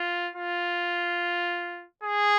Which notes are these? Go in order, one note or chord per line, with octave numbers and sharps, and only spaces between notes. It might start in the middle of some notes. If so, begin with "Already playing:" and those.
Already playing: F4
F4
G#4